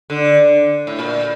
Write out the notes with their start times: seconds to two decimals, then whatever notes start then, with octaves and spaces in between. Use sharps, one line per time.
0.10 D3
0.87 A2
0.99 A#2